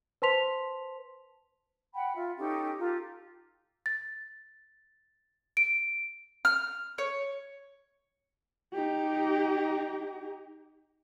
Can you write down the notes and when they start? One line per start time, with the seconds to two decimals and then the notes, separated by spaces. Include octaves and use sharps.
0.22 B4 C5 A5 C6 B6 F7
1.94 F#5 G5 B5
2.15 F4 E5
2.37 C#4 D#4 G4 A4
2.79 F4 G4 A4 A#5
3.86 A6
5.57 D7
6.45 F6
6.98 C#5
8.73 D#4 G4